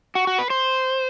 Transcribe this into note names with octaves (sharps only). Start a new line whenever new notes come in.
F#4
F#4
B4
C5